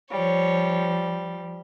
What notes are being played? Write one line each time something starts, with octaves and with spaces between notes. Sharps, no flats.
F3 G3 C#5